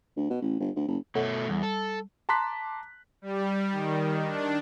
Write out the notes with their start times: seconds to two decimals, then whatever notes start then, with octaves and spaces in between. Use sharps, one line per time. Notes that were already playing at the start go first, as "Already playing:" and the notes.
0.17 D2
0.30 B2
0.42 A1
0.60 G1
0.76 D2
0.88 F#1
1.15 B2 A3 A4 C#5 F#5
1.49 E2 G3
1.63 A4
2.29 A5 A#5 C6 D6 F#6 B6
3.22 G3
3.72 D#3
4.24 D4